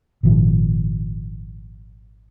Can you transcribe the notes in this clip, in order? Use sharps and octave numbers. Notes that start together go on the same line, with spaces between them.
G#1 A#2 D#3 F3